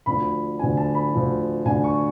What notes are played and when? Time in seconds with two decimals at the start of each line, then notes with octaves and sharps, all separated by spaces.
0.06 D2 D3 F3 B5
0.59 D2 D3 F3 G#5
0.77 A5
0.95 B5
1.13 D2 D3 F3
1.66 D2 D3 F3 G#5
1.84 C#6